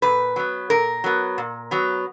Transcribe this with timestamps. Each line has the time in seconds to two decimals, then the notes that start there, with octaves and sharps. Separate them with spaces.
0.02 A#2 B4
0.36 F#3 B3
0.70 A#2 A#4
1.04 F#3 B3
1.38 A#2
1.71 F#3 B3